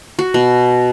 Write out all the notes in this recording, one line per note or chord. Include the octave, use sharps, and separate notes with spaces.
F#4
B2